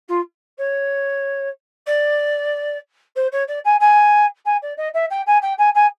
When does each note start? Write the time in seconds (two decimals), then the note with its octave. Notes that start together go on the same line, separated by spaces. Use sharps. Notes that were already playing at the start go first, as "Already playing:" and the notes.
0.08 F4
0.58 C#5
1.86 D5
3.16 C5
3.32 C#5
3.48 D5
3.64 G#5
3.80 G#5
4.45 G#5
4.62 D5
4.77 D#5
4.94 E5
5.10 G5
5.26 G#5
5.42 G5
5.58 G#5
5.74 G#5